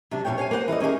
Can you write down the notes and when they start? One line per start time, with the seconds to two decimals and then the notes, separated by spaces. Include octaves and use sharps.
0.11 C3 F#3 D4
0.25 F2 B2 F#3 A3 C#5 G5
0.38 C#5 F5 F#5 G#5
0.51 A#3 B3 C5 F#5
0.68 E3 A#4 D5 D#5
0.80 A#3 C#4 D#4 G#4 A#4